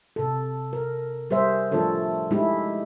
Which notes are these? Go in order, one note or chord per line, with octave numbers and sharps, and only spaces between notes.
C3 A4
A#4
G3 G#4 A#4 C5 E5
F3 A3 D4 F4 A4 C#5
G#3 A3 D#4 E4 G4